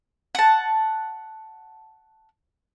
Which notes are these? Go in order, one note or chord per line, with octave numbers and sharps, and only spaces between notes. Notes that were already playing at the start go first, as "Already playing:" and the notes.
F#5 A5